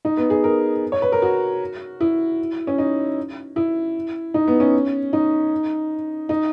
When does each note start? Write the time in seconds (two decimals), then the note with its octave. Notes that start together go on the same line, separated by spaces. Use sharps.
0.05 D#4
0.17 B3
0.30 G#4
0.44 A#4
0.92 C#5
1.02 B4
1.12 A#4
1.22 F#4
2.01 E4
2.67 C#4
2.78 D#4
3.56 E4
4.34 D#4
4.48 B3
4.60 C#4
5.13 D#4
6.29 D#4